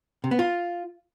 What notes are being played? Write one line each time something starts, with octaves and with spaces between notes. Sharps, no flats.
C3
B3
F4